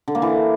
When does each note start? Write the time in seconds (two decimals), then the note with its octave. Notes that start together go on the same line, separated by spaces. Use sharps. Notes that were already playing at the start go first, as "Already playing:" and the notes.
0.08 D3
0.15 A#3
0.22 E3